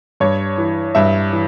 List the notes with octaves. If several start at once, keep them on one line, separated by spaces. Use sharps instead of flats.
G2 C#5
E3
G2 E5
E3